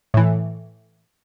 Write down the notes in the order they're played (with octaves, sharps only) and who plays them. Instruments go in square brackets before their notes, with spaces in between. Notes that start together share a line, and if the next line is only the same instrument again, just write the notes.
[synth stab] A2 E3